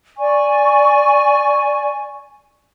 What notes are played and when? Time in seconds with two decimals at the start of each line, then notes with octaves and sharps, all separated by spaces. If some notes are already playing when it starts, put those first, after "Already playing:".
0.18 D5 G#5 C#6